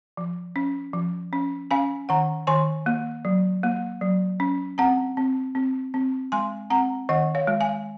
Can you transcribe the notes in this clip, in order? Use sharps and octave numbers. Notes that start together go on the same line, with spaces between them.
F3
C#4
F3
C#4
C#4 F5 G#5
D#3 F#5 A#5
D#3 G#5 C6
A#3
F#3
A#3
F#3
C#4
C4 F#5 A#5
C4
C4
C4
G#3 G#5 C6
C4 F#5 A#5
D#3 D#5 F#5
C#5 F5
G#3
F5 G#5